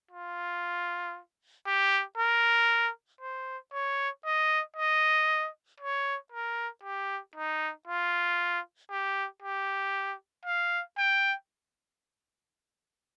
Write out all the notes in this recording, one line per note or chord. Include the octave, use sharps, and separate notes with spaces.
F4
G4
A#4
C5
C#5
D#5
D#5
C#5
A#4
G4
D#4
F4
G4
G4
F5
G5